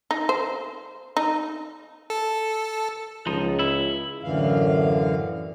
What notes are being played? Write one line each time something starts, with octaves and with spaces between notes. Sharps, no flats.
D#4
C5
D#4
A4
C#2 F3 D#4
E4
F#2 A2 D3 E3 F5